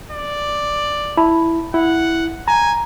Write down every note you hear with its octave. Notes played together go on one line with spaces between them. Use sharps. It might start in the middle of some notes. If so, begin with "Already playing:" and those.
D5
E4 A5 B5
E4 F#5
G#5 A#5